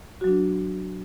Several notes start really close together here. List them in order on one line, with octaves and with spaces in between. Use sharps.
F#4 F#3 D4